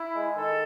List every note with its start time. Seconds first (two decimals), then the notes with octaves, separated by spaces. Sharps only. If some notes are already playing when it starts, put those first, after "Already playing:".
Already playing: E4
0.13 G#3
0.36 D#3 A4